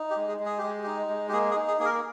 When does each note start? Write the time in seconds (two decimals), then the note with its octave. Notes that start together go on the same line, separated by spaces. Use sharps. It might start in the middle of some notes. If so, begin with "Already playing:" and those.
Already playing: D#4
0.10 G4
0.16 G#3
0.28 G#4
0.40 G#3
0.45 G#4
0.58 G#3 G4
0.83 D#4 G4
1.09 G#3
1.28 G4
1.33 A#3 G#4
1.51 G#4
1.56 D#4
1.67 G#4
1.79 A#3 G#4
1.85 A#4